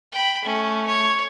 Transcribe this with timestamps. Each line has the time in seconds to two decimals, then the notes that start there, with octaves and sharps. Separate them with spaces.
0.12 G5 B5
0.44 A3 C#4
0.87 C#5